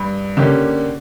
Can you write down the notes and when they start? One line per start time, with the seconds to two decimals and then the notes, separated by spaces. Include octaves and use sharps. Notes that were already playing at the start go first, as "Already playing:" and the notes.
Already playing: G2
0.37 D3 A#3 C#4 G4